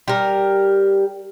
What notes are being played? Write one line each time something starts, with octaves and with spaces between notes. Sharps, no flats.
G3 A#4